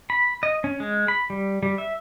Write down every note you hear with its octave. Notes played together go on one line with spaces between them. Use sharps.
B5
D#5
C#4
G#3
B5
G3
G3
E5